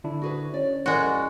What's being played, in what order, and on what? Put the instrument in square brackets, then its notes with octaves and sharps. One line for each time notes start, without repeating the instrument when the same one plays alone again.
[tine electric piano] D3 D4 E4
[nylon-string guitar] F#4 G#4 B4
[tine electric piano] C#4 [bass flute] C#5 [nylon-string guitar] D5
[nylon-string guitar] F2 E4 D5 [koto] G#3 F#4 [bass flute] A#4